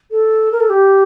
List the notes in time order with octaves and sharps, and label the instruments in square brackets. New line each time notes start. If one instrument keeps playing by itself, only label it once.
[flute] A4
A#4
A4
G4